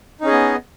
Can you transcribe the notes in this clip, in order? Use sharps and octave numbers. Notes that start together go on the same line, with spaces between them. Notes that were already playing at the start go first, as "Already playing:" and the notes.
B3 C#4 D#4 G#4 D#5